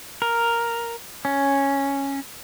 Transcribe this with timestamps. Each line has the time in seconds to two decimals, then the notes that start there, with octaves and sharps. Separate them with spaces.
0.22 A#4
1.25 C#4